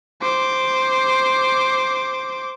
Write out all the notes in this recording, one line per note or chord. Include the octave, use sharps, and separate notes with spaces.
C5 D6